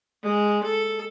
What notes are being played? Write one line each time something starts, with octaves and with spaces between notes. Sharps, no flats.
G#3
A4